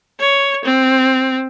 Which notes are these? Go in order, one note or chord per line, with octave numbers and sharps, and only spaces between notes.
C#5
C4